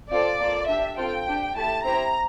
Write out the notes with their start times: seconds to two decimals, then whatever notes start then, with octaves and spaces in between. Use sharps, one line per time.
0.10 C4 F4 A4 D5
0.39 A#3 F4 A4
0.68 D4 G4 E5
0.97 C4 F4 A4 G5
1.27 D4 G4
1.55 A3 E4 G4 A5
1.84 C4 E4 G4 A#5